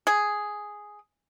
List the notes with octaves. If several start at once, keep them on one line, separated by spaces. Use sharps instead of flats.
G#4